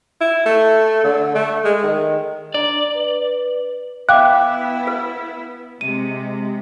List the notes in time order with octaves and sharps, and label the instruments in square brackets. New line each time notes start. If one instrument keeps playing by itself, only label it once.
[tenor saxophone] E4
A3
D3
A3
G#3
D#3
[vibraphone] D4 A#5 [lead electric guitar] D5
[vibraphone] B4
[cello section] B3 E4 [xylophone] E5 G5 [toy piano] F5 D6 [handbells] F#6
[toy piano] B4
[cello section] C3 G#3 [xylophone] D#7